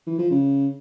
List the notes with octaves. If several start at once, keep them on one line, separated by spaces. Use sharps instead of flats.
E3
F3
C#3